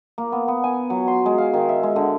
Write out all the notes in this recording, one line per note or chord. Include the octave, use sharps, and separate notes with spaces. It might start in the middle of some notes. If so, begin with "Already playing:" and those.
A#3
B3
B3
G#5
F#3
C6
G#3
F5
D#3
E5
G#3
D3